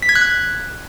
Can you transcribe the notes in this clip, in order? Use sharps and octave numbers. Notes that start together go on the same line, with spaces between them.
B6
G#6
F#6